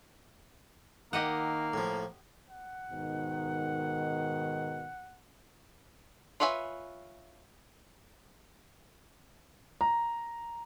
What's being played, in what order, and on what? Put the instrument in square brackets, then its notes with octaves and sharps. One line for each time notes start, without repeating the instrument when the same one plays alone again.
[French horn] D#3 [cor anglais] A#3 [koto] G4 D#5 F#5
[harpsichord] A2 F3
[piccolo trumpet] F#5
[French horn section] G#2 B2 D#3
[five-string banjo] F4 B4 C#5 E5 G#5
[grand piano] A#5